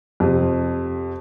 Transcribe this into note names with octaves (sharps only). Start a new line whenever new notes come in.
F2 C3